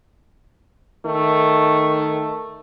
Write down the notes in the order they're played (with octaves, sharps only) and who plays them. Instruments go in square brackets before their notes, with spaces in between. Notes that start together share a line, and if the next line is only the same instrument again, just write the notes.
[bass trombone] D#3 [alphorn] A3